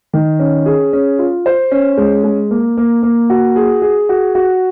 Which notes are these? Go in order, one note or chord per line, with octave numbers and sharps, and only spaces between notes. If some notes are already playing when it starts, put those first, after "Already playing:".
D#3
C#4
G#4
C#4
F4
C5
C#4
G#3
G#3
A#3
A#3
A#3
F#4
G#4
G#4
F#4
F#4